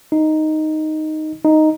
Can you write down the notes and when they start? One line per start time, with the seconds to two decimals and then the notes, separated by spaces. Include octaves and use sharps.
0.12 D#4
1.45 D#4